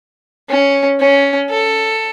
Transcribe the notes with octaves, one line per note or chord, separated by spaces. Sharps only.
C#4
C#4
A4